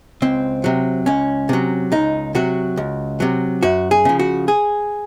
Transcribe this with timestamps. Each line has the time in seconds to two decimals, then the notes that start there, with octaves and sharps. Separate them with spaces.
0.22 C#2 C4
0.64 C3 F#3
1.06 C#2 C#4
1.49 C3 F#3
1.92 C#2 D#4
2.35 C3 F#3 F#4
2.77 C#2
3.20 C3 F#3
3.63 F#2 F#4
3.91 G#4
4.05 C#3 F3
4.19 F#4
4.48 G#4